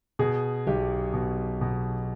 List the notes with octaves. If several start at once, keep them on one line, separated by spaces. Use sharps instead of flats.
B2 G#4
B1 G4
B2
B2